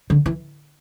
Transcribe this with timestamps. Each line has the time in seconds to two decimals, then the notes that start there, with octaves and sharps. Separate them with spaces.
0.10 D3
0.26 E3